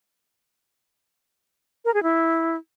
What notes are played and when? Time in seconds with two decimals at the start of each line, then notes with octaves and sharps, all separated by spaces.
1.85 A#4
1.94 G#4
2.03 E4